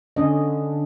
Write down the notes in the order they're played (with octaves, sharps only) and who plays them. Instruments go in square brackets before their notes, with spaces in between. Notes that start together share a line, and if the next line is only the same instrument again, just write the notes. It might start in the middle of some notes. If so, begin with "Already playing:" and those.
[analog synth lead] D3 [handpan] C#4 D#5